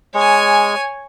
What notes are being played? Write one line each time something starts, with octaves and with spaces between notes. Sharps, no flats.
G#3 C#5 G#5